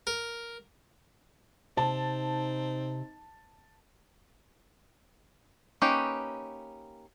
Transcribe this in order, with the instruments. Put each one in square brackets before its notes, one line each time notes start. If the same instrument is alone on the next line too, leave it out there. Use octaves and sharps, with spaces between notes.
[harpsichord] A#4
[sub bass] C3 [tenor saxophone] C4 [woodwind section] D#4 [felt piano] A5
[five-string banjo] A#3 C#4 D#4 G4 B4